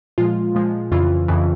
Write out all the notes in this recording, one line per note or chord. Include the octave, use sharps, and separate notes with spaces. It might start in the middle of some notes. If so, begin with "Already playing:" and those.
A#2 F3 G#3 F4
A#2 F3 G#3
F2 C#3 E3 F4
F2 C#3 E3